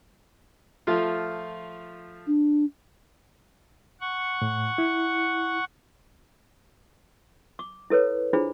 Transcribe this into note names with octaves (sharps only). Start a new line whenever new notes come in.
F3 A3 F4
D4
F#5 C#6
A2
E4
D6
E4 A4 B4 C#5
D4 E4 F4 G#4 C5 B5